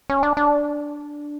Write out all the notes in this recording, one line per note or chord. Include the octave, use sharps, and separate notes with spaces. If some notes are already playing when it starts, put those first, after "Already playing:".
C#4
D4
D4